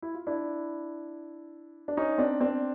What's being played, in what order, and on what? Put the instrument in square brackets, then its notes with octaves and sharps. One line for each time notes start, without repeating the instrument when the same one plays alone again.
[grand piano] E4
F4
D4 E4
D4
C#4 D#4
C4 D4
C4 D4